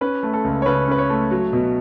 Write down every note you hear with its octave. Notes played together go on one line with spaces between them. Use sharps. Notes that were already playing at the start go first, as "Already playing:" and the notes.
C#4 B4
A3
A4
C#2
C#5
C#3 B4
C#4 B4
C#5
A3
F#3
B2